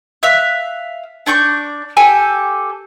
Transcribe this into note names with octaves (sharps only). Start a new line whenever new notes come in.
E5 F5 F#6
D4 D5 C#6 G6
G4 A4 G#5